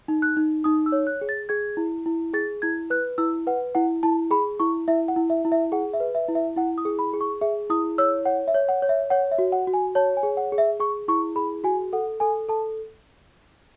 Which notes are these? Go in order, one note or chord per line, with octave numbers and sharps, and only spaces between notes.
D#4
F#6
D#4
D#4 D#6
E6
C#5
F#6
G#4
A6
G#4 G#6
E4
E4
G#4 A6
E4 G#6
B4 F#6
E4 E6
B4 F#5
E4 F#5
E4 A5
G#4 B5
E4 C#6
E4 E5
F#5
E4
E5
E4
E5
G#4 F#5
E5
B4
E5
E4
E5
E4 F#5
D#6
G#4
B5
G#4
C#6
G#4 E5
E4 D#6
C#5 E6
C#5 F#5
E5
C#5
F#5
C#5
E5
C#5 F#5
E5
F#4
F#5
F#4
G#5
C#5 A5
G#5
G#4
F#5
G#4
E5
G#4 C#6
E4 C#6
G#4 B5
F#4 G#5
A4 F#5
A4 G#5
A4 A5